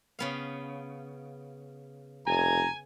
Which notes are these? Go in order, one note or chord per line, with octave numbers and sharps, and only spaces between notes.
C#3 B3 F5
F1 G#5 A#5